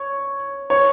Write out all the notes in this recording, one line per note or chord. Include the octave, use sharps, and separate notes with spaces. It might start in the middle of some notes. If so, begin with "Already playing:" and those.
Already playing: C#5
C#5